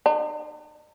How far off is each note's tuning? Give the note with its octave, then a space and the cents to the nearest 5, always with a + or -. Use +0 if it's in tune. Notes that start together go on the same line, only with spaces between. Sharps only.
D#4 -45